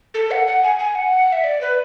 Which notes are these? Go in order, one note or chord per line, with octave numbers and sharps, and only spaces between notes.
A4
F#5
F#5
G#5
G#5
F#5
E5
D5
B4